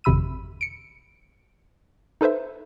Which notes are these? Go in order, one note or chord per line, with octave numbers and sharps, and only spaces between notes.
G#1 F2 C3 B5 E6 D#7
C#7 D7
D#4 A4 B4 C5 E5